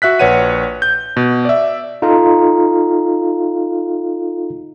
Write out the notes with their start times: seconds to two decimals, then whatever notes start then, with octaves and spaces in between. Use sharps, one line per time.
0.02 F#4 E5 F#6 B6
0.19 A#1 B4 C#5 F#5 D#7
0.82 G6
1.17 B2
1.45 D5 E5
2.02 D#4 F4 A4 F5 A#5